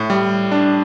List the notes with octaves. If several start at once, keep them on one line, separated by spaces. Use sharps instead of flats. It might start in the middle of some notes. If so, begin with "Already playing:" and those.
Already playing: A2
G3
D4